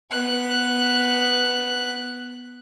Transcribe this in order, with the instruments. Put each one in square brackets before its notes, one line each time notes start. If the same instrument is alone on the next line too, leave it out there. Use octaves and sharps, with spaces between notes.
[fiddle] B3 F#6